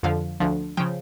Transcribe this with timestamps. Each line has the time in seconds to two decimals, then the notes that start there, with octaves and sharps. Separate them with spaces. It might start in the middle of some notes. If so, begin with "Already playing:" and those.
0.03 F2 D3 F3 F5
0.40 D2 D3 F3
0.77 C#3 F3 G5